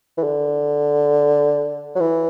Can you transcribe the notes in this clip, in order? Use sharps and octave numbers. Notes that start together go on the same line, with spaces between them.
E3
D3
F#3
E3